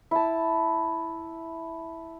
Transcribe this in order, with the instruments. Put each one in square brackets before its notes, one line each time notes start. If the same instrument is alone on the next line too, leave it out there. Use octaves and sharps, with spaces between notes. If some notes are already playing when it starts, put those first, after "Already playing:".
[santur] E4 A5